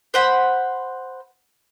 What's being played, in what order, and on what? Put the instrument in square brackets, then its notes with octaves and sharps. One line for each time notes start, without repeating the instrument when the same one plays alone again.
[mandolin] C5 F#5 B5